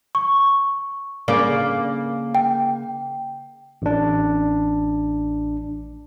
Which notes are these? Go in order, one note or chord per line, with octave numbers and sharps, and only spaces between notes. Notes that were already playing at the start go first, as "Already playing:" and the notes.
C#6
C#3 A#3 D5
G5
A1 D4